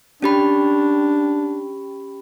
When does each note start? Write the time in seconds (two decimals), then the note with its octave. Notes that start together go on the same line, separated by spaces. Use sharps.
0.22 C#4 D4 G4 B5